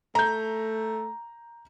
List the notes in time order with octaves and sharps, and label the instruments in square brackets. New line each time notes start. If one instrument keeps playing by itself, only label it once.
[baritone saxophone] A3 [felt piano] A#5 G6